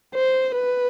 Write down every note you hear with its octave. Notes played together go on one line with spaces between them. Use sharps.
C5
B4